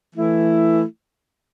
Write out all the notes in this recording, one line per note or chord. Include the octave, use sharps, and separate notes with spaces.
E3 A3 E4